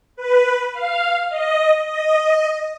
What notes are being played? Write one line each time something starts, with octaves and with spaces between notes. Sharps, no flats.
B4
F5
D#5
D#5